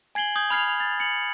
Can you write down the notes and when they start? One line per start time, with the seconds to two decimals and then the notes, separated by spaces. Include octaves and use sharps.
0.15 G#5 G#6 C7 F#7 G7
0.36 D#6 G6 G#6 F#7
0.50 B5 F6 G#6 C7 F7
0.80 A6
1.00 C#7 F#7